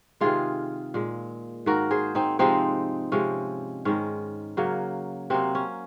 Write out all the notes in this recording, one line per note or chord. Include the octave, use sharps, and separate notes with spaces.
C3 D#3 G#3 F4 G#4
A#2 G#3
G#2 D#3 A#3 F#4 A#4
G#4 C5
C4 D#4
C3 F3 G#3 C4 D#4
C3 F3 G#3 C#4
G#2 D#3 G#3 C#4
C#3 F#3 A#3
C3 F#3 A#3 C4
C#4